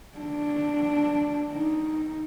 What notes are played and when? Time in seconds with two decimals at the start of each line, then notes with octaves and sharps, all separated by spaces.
0.18 D4
1.53 D#4